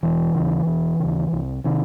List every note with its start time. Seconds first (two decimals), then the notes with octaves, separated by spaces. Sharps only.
0.03 E1 E3
0.35 D#2 C#3
0.67 E1
1.00 D#2 C#3
1.32 C2
1.64 C3 D#3